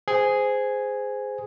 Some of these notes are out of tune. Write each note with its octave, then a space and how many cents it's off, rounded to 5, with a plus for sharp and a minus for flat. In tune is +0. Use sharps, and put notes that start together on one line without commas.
G#4 +0 C5 -20